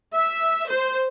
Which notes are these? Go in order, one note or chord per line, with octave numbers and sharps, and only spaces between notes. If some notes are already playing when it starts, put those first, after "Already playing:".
E5
C5